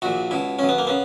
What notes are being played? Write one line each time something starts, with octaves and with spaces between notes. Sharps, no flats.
A#1 A#2 F#4
C#2 B2 E4
B1 B2 C#4
B3
A#3
C#3 B3